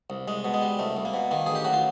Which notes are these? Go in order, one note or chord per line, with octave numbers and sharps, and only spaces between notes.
C2
C2 G#3
B2
G#3
G3
C2 A3
C2
A#3
B2
D#3 A#3
A1 G#4
G4
F#3 F#4
F4